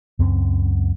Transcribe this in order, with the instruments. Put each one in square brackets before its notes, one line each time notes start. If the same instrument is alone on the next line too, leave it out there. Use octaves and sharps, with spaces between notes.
[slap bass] C#2 F#2 C4